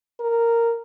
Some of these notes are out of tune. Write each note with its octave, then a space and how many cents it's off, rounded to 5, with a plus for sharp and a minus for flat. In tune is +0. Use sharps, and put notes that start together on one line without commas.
A#4 -10